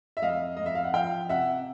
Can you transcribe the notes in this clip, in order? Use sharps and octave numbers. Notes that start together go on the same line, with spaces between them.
E5
F2 D#5 F5
F2 D#5
E5
F5
F#5
F3 F5 G5
C3 E5 F#5